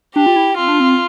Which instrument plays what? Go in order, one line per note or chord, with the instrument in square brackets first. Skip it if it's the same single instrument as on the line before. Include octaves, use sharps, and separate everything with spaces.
[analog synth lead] D4 [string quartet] G4
[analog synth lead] F4
E4
[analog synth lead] C4 [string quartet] F4
[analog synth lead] D4
C4